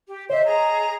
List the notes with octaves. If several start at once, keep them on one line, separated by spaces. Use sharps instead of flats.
G4
C5 C#5 D#5 E5
G#4 A#5